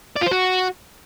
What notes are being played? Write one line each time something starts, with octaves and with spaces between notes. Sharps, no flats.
D5
F4
C5
F#4